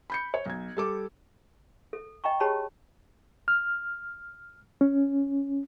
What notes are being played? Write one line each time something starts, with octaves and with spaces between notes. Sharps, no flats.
B5 G6 C#7
C#5
B1 G#6
G3 A4 D6
A4
D#5 G5 A#5 C#6
G4 G#4 C#5 A5 B5
F6
C#4